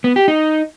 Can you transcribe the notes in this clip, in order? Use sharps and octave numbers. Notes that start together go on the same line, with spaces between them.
B3
G4
D#4